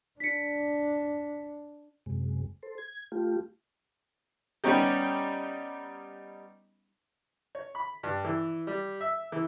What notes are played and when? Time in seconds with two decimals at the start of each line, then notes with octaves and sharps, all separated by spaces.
0.20 D4 B6 C#7
2.06 F#2 C3 G#3
2.63 A4 C5
2.78 G#6
3.12 A3 F4 G4
4.64 G3 B3 C#4 D#4 G4
7.55 C#5
7.75 B5
8.03 G2
8.24 E3
8.67 G3
9.01 E5
9.32 E3